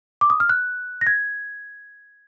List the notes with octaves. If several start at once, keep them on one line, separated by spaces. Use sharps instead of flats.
D6
D#6
F6
F#6
A#6
G#6